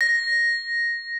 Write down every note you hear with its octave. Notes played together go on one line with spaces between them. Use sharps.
A#6